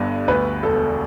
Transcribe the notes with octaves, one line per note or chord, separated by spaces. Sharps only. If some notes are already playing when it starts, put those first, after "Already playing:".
Already playing: G1 G2 D3
D2 B4
E1 A4